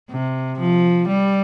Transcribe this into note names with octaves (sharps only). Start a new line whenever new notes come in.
C3
F3
G3